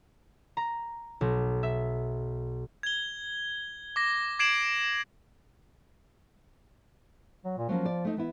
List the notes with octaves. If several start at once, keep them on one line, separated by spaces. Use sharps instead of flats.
A#5
B1
E5
G#6 G7
D6 A#6
D6 G#6 C7 D7 E7 F#7
F#3
A#2
F3 F#3 A#3 C#4
D5
A3 D#4
E3 B3 E4